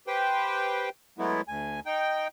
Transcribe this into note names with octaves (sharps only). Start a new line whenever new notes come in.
G4 B4 C5 G5
F#3 G#3 A3 B3 E4
D2 G#5
D#4 G5